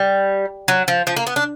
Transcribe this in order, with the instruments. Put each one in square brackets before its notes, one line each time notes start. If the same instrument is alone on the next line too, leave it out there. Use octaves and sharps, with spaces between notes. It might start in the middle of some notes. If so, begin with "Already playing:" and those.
Already playing: [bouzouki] G3
F#3
F3
F3
A#3
B3
D4